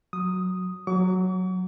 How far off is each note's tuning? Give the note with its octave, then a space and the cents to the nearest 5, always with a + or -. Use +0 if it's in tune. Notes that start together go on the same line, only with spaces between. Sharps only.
F#3 -5 D#6 +0
F#3 +0 C#6 +45